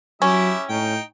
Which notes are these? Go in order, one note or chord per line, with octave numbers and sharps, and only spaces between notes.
F#3 C#4 E4 G4 E5
A2 D#4 G5